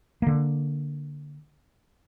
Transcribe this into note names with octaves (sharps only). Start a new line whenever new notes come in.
D3 A#3